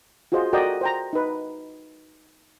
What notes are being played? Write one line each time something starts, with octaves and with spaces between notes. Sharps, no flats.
F4 F#4 G#4 C5 D#5
F#4 A4 A#4 D5 D#5 G5
C5 G5 A#5
D#4 B4